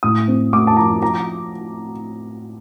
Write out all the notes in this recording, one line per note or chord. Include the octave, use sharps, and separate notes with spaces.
A2 D#6
C4
A3 D6
A5
F3 A#5
F3 A#5